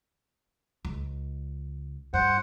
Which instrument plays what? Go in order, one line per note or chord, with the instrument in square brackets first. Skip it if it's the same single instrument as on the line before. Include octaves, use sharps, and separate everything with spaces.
[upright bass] C#2
[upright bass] G2 [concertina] C5 F#5